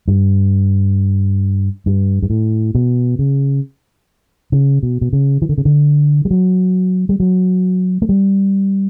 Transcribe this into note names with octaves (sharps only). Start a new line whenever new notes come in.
G2
G2
G2
A2
B2
C#3
C#3
B2
B2
C#3
E3
D3
C#3
D3
G3
F#3
G3
F#3
A3
G3